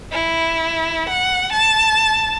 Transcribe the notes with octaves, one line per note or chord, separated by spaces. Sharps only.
E4
F#5
A5